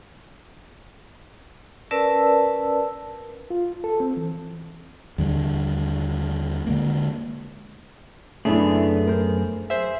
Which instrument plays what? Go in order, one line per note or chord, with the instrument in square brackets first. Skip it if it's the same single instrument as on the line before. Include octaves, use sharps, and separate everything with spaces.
[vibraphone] C#4 A#4 B4 D5 A5 E6
[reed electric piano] F4
A4
C4
E3
[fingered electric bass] D#2 D3 G3
D3 G#3 A#3
[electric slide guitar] F#2 B3 G#4 [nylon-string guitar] C#3 D4 E4 [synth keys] A3
[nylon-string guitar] A#4 C5
[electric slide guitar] G#4 [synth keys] C5 E5